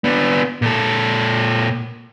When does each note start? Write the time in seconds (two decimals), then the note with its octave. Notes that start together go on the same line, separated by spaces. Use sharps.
0.04 B3 D4
0.62 A#2 A4